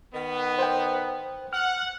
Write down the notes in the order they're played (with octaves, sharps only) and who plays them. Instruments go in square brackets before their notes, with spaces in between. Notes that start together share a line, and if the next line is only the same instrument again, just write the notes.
[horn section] D#3 B3
[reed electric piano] C5 G5
[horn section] F#5 [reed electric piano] F6